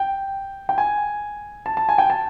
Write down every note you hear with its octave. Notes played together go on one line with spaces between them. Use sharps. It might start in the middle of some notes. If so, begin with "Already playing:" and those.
Already playing: G5
G5
G#5
A5
A5
G#5
G5
A5